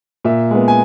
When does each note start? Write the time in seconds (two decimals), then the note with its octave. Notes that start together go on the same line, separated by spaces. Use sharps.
0.25 A#2 E5
0.51 G#3 B3
0.68 G#5